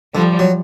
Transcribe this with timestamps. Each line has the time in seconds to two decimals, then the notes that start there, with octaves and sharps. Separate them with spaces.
0.14 D3 F3 G3
0.39 F#3